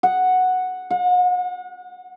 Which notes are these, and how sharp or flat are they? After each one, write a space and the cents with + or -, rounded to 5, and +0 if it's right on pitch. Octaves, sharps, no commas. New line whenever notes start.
F#5 -5
F#5 -40